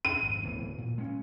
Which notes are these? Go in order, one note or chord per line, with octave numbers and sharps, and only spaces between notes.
D#7
G#1
D1 B2 E3
A#2
G#3 C#4